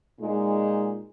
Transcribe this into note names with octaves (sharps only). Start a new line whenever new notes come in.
A#2 G#3 D#4